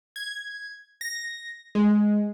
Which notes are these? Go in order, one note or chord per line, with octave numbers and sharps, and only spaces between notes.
G#6
A#6
G#3